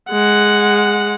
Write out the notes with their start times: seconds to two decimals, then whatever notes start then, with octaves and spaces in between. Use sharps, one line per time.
0.11 G#3 F#5